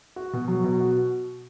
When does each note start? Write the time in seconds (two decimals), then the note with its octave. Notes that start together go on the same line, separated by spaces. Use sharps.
0.16 F#4
0.33 B2
0.48 F#3
0.64 B2
0.80 F#4